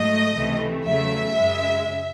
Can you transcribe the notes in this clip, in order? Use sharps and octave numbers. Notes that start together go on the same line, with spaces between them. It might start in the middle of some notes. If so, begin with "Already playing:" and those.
Already playing: G#2 F#3 A3 D#5
C#2 C3 E3 A3
E2 C#3 F#3 A3 E5
F#2 C#3 G#3